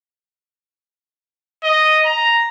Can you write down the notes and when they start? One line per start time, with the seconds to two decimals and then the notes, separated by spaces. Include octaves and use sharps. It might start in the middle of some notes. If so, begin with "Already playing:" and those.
1.64 D#5
2.05 A#5